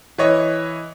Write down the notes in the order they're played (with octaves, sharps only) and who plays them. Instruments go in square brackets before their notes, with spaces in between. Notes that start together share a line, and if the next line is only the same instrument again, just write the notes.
[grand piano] E3 C#5 D#5